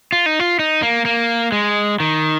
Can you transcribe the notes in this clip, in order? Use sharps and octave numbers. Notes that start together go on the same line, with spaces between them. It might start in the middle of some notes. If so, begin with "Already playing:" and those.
F4
D#4
F4
D#4
A#3
A#3
G#3
D#3